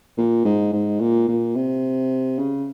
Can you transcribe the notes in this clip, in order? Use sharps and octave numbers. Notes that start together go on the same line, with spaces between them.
A#2
G#2
G#2
A#2
A#2
C3
C#3